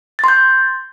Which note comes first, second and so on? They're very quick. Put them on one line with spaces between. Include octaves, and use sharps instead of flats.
A6 C6 G6